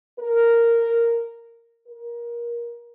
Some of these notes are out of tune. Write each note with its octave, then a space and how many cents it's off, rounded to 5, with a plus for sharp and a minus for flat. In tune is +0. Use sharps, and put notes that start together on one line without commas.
A#4 -5
A#4 +20